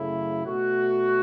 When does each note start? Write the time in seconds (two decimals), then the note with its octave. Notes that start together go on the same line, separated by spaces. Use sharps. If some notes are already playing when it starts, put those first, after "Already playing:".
Already playing: F#2 C#3 A3 E4
0.44 B2 A3 F#4